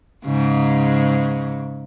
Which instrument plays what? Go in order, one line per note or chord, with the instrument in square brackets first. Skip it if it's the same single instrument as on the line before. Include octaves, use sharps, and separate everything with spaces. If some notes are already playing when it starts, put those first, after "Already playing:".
[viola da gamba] G#2 C#3